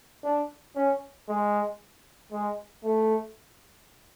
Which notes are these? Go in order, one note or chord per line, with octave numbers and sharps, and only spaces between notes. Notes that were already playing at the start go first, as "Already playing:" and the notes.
D4
C#4
G#3
G#3
A3